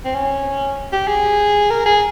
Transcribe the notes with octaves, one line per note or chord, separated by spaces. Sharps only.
C4
C#4
G4
G#4
A#4
G#4